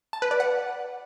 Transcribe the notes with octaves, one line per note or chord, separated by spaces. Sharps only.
A5
B4
D5
F#5